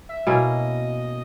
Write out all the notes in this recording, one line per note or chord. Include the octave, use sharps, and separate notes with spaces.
E5
B2 A#3 C#4 E4 D#5